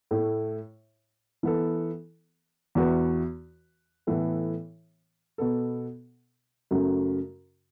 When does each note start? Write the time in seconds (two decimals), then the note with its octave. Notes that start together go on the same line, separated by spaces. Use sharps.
0.11 A2 A3 E4
1.43 E3 B3 A4
2.75 E2 E3 B3 F#4 B4
4.07 A2 E3 B3 A4
5.38 B2 B3 A4
6.71 F#2 C#3 A3 F#4